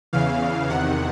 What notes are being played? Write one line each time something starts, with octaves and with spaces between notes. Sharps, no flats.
E2 C#3 E3 F5
E2 C3 D#3 F#5